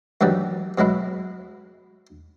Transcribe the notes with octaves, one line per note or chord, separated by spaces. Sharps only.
G2 D#3 E3 F#3 G3
B2 F#3 G#3 E4